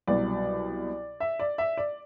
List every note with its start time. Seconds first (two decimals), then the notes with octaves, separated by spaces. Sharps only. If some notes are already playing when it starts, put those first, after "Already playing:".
0.07 C2 B2 F#3 D5
1.20 E5
1.40 D5
1.58 E5
1.77 D5